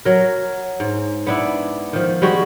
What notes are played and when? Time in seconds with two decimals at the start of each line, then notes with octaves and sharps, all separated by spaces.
0.05 F#3 A#4
0.80 G#2
1.27 B3 D4 E4
1.93 D#3 F3
2.22 G3 G#3 F#4 G#4